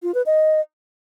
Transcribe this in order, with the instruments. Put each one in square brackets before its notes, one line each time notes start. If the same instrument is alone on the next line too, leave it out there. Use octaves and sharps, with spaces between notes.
[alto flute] F4
B4
D#5